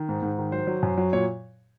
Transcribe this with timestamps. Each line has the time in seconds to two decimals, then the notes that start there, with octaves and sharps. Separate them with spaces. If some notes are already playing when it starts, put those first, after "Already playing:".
Already playing: D#3
0.09 G#2
0.22 G#2
0.39 D#3
0.52 F#3 C5
0.67 F#3
0.83 F#2
0.97 F#3
1.13 A#2 C#5